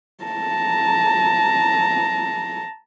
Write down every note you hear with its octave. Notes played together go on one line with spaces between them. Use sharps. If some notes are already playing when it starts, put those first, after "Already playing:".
A5 A#5